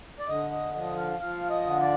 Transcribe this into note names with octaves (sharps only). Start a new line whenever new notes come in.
D5
D3 D#5
D#5
F3 D#5
F5
F3 F5
D#5
D3
D5